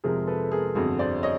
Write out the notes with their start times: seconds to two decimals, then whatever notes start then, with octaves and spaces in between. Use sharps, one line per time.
0.04 F2 C3 F3 G#3 G#4 A#4
0.27 A4 B4
0.51 G#4 A#4
0.75 G1 F2 D3 F#4 G#4
0.99 C5 D5
1.23 C#5 D#5